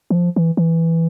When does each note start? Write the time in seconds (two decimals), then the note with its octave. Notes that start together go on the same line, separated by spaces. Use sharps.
0.10 E3
0.15 F3
0.36 E3
0.57 E3